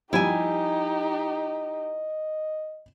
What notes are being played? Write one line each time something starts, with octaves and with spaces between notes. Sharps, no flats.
F3 G3 D#4 E4 G4 D#5 G#5